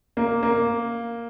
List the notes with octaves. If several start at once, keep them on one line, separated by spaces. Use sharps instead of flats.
A#3
A#3